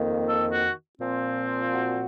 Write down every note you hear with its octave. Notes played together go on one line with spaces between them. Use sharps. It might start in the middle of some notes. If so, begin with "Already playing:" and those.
Already playing: F2 D#3 A#3
A4
F#4
A#2 F3 C4
F#4